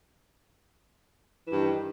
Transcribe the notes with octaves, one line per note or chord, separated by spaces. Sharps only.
G2 D#3 E3